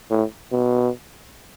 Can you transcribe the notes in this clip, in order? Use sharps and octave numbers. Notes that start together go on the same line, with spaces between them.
A2
B2